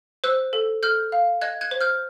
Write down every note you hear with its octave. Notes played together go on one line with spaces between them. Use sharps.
C5 E6 F#6
A4
A4 F6 G6
F5
D#5 F#6 G#6
F#6 G#6
C5
F6 G6